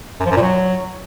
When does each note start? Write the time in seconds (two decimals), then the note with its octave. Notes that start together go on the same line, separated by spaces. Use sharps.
0.20 F#2
0.26 F3
0.31 F#2
0.37 A#2
0.42 F#3